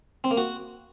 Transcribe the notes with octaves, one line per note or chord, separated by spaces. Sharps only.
C4
A#3
F#4